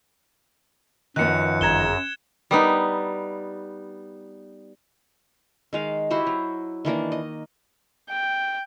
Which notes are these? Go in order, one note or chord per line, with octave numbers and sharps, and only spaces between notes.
F#2 D#3 F3 B3 F#6 C#7
G1 G#4 A#5 G#6 E7 G7
G3 B3 D#4
D#3 G#3 F5
E4 F#4 G4 C5
F#3
D#3 E3 A#3 D4
D#5
G5